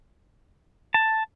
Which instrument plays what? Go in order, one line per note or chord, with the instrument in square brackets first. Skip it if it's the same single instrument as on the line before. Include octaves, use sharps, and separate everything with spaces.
[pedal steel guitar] A5